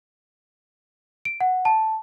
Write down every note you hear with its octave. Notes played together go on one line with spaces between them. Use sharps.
D7
F#5
A5